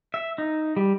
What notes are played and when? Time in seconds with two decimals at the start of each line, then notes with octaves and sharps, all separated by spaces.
0.14 E5
0.38 D#4
0.76 G3